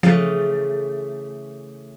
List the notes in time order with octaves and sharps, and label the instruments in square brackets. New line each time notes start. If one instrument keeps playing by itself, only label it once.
[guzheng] C#3 E3 A3 [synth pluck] F3